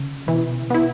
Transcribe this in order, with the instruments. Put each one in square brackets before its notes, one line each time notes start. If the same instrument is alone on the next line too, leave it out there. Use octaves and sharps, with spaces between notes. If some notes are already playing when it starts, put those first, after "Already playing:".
Already playing: [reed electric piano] C#3
[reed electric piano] B2 [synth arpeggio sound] E3
[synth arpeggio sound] B3 E4